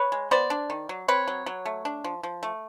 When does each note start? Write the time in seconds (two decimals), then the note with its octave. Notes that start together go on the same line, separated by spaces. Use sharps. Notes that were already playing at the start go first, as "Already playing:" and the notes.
Already playing: B4 C#5
0.12 G#3
0.31 B3 C5 D5
0.50 D4
0.70 D#3
0.89 F#3
1.08 C4 B4 C#5
1.28 F#3
1.46 F#3
1.65 A3
1.85 D4
2.04 F3
2.23 F3
2.43 A3